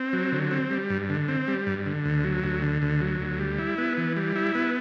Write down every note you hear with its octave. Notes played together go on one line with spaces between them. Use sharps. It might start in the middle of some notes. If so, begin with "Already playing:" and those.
Already playing: C4
F#3
D3
C4
G3
G2
D3
C4
G3
G2
D3
D2
F#3
D2
D3
D2
F#3
D2
G3
E4
B3
E3
G3
E4
B3